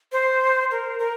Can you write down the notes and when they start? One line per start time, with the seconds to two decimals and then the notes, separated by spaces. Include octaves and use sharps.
0.12 C5
0.71 A#4
0.99 A#4